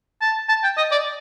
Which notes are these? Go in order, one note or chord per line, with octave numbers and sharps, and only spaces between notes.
A5
A5
G5
D#5
D5